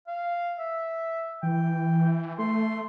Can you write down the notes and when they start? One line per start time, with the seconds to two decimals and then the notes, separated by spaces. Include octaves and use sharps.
0.07 F5
0.59 E5
1.43 E3 G5
2.39 A3 C6